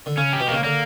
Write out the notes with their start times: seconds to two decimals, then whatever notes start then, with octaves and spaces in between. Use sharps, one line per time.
0.06 D3
0.17 C#3 C#4
0.33 G4
0.40 B2
0.48 C#3 A#3
0.64 D3 A#3